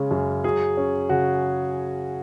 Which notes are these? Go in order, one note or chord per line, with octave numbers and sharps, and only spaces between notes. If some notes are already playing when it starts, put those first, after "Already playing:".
Already playing: C#3 G#3 C#4
F#2
F#3 G#4
C#4
C#3 F#4